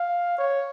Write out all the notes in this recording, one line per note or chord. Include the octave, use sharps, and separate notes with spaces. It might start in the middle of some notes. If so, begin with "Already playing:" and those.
Already playing: F5
C#5